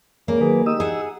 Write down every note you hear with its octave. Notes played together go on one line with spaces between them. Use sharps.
C#3 A#3 D5
D#3 F#3 G#4 B4
D#4 G4 D#6 E6
G#4 F#5